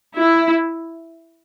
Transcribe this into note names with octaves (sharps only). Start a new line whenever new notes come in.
E4